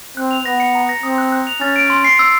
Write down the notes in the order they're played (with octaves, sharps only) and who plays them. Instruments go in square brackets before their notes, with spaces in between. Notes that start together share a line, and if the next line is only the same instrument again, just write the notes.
[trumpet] C4 [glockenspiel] F#6
[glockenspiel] F7
[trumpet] B3 [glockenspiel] A#6
[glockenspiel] C#7
A#5
A#6
[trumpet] C4 [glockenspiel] D#6
[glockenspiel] F#6
F#6
F7
[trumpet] C#4 [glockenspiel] A6
[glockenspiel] D7
C6
C7
E6